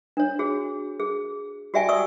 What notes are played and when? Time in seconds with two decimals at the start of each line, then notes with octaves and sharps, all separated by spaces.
0.17 D4 C#5
0.39 F#4 G#4
1.00 G#4
1.74 F#4 G4 D5 E5 G5 G#5
1.89 D5 C#6 D#6 E6